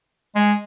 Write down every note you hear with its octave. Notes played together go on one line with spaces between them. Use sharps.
G#3